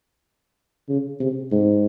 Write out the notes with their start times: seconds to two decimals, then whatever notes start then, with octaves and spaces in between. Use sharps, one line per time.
0.89 C#3
1.20 C3
1.51 G#2